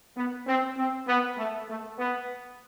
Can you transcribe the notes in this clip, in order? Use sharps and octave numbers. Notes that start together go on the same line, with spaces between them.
B3
C4
C4
B3
A3
A3
B3